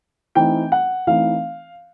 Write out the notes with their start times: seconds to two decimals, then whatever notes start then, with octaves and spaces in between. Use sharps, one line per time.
0.35 E3 A3 C4 D#4 G5
0.72 F#5
1.07 E3 A3 C4 D#4 F5